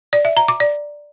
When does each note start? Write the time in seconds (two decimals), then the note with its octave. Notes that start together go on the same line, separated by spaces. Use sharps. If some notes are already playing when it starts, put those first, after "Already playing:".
0.13 D5
0.25 E5
0.37 A#5
0.48 D6
0.60 D5